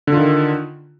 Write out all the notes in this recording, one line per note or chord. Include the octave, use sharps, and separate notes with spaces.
D3 D#3 F4